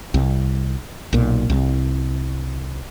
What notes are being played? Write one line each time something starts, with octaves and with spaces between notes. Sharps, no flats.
C2
B1 A#2
C2